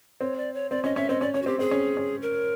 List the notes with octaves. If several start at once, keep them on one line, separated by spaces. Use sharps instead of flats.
C4 C#5
D5
C#5
C4 D5
C#4 D#5
C#4 E5
C4 D#5
C#4 D5
C#4 C#5
F#4
C4 G4
C4 G#4
C#4
C#4
A#4